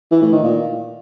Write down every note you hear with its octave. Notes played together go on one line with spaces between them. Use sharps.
E3
A2
D#3
A#2